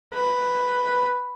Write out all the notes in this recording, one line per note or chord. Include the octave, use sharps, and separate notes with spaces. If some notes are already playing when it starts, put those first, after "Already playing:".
B4